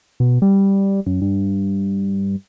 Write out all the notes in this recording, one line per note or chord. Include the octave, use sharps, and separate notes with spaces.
B2
G3
F#2
G2